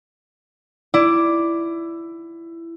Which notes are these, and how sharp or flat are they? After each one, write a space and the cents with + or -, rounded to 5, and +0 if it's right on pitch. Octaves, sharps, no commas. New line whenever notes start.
E4 +15 D5 +0